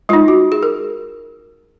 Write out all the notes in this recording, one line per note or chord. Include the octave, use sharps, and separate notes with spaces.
G#3 D#4 F4
F#4
G#4
A#4